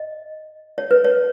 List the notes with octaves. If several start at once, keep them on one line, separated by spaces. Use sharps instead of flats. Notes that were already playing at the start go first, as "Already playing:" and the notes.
Already playing: D#5
C#5
B4
C#5